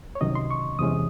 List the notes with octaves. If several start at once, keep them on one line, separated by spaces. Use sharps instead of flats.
C#5
C2 C3 D#3 F#3 C#4 D#5
C6
C#6
E2 C3 E3 G#3 C#4 D#6